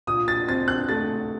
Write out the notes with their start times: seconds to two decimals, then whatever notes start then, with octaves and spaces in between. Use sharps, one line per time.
0.07 A#2 D#6
0.28 A6
0.48 C4 A6
0.68 F#6
0.89 A3 A6